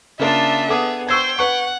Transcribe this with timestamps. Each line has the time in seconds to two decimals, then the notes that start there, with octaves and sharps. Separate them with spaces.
0.19 C#3 A#3 D4 F4 E5
0.69 B3 G#4 A4 D6 D#6
1.09 C5 G5 C#6 E6 G#6
1.39 B4 F#5 C#6